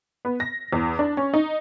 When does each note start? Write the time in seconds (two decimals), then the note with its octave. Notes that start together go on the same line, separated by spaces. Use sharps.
0.25 B3
0.40 A#6
0.73 E2
0.99 D4
1.17 C#4
1.34 D#4